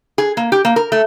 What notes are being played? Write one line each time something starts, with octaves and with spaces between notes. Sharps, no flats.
G#4
A#3
G4
A#3
A#4
A3